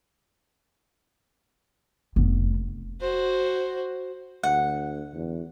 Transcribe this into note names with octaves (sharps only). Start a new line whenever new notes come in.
F1 B3
F#4 C5
D2 F#5
E2